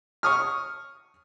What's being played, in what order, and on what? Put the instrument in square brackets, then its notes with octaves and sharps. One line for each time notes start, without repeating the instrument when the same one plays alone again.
[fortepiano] C#6 D#6 F6